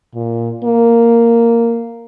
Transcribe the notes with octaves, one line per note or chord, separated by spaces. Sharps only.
A#2
A#3